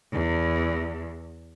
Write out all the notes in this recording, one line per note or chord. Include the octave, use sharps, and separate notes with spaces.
E2